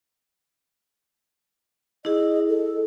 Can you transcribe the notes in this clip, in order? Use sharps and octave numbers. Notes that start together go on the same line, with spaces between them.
E4 G#4 D#5
A4